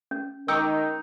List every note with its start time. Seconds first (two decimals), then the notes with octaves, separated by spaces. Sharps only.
0.11 C#4
0.48 D#3 D#4 A#4 G5 C#6 D6 E6